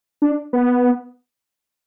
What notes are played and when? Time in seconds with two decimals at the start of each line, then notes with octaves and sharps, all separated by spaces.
0.22 D4
0.53 B3